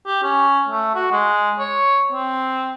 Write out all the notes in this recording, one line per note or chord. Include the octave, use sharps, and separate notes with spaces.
G4
C#4
A3
F#4
G#3
C#5
C4